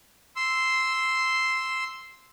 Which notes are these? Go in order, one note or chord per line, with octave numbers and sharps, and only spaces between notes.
C6 E6